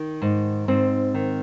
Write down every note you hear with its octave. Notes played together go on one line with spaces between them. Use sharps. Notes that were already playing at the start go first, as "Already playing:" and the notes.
Already playing: D#3
G#2
G#2 C4
D#3